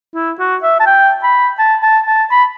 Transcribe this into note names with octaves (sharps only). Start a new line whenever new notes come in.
E4
F#4
E5
A5
G5
B5
A5
A5
A5
B5